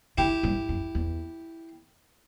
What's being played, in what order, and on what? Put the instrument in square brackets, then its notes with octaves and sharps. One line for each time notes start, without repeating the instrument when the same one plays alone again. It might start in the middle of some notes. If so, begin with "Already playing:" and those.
[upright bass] D3 [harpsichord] E4 G4
[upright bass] G2
F#2
E2